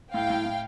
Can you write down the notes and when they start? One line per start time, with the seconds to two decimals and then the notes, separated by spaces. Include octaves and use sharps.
0.14 A2 F5 G5
0.30 A2
0.46 A2